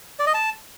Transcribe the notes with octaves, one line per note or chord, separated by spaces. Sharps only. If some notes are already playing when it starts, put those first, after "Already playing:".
D5
D#5
A5